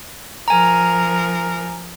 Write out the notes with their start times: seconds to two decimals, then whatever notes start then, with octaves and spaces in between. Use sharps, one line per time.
0.48 F3 A#4 G#5 A#5